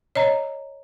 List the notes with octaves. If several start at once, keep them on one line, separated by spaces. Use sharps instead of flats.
C#5 D#5 A#5